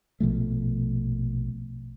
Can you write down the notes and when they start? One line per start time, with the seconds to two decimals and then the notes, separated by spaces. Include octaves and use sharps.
0.20 A#1 B2 F3 A3